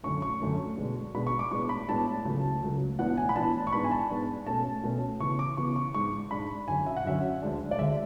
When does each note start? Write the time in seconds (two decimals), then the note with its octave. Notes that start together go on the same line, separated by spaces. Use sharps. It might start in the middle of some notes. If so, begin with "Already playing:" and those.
0.03 F#2 D3 A3 C#4 C#6
0.22 C#6
0.40 F#2 D3 A3 C#4
0.77 B2 G#3 D4
1.14 B2 G#3 D4 B5
1.27 C#6
1.39 D6
1.51 A2 G#3 B3 D4 C#6
1.69 B5
1.88 A2 G#3 B3 D4 A5
2.25 C#2 C#3 F#3 A3
2.62 C#2 C#3 F#3 A3
2.99 A2 E3 B3 D4 F#5
3.17 G#5
3.29 B5
3.36 A2 E3 B3 D4 A5
3.67 C#6
3.73 G#2 G#3 B3 D4 B5
3.84 G#5
3.91 A5
4.10 G#2 G#3 B3 D4
4.47 B2 A3 C#4 A5
4.83 B2 A3 C#4
5.20 C#3 E3 B3 C#6
5.39 D6
5.57 C#3 E3 B3 C#6
5.76 C#6
5.95 G#2 G#3 D4 C#6
6.31 G#2 G#3 D4 B5
6.68 F#2 D3 F#3 C#4 G#5
6.86 E5
6.97 F#5
7.05 F#2 D3 F#3 C#4 E5
7.42 D2 D3 G#3 D4
7.71 D5
7.79 D2 D3 G#3 D4 E5